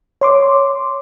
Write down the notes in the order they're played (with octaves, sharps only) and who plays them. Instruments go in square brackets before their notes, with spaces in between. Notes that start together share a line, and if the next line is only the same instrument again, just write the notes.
[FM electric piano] C#5 C6 D6